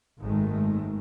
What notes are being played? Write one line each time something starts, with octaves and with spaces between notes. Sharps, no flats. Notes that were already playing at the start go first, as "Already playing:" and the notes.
G#1 F#2 D#3 G#3 A3